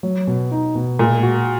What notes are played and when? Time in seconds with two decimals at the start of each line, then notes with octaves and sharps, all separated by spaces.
0.03 F#3
0.27 B2
0.51 D#4
0.75 B2
0.99 A#2 G#3
1.23 F#4